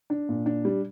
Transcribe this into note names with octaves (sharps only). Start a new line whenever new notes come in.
D4
A#2
D4
G3